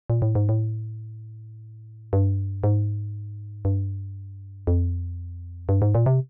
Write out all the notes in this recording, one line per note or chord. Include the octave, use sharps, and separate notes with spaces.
A#2
A2
G#2
A2
G2
G#2
G2
F2
G2
G#2
A#2
C3